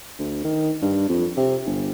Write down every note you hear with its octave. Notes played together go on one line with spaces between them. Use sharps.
D2
D#3
G2
F2
C3
G1